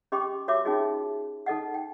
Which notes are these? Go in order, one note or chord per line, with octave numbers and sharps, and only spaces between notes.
C#4 G4 D#5 G5 C6 D6
F#4 A#4 C#5 E5 C6 D6
C#4 D#4 F4 F#4 G#4 D#5
D#4 A4 D#5 F#5
G5